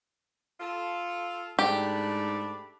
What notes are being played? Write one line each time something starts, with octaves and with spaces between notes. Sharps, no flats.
F4 A4
G#2 A3 D4 G4 B5